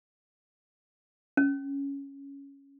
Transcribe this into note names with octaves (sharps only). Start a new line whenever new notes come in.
C#4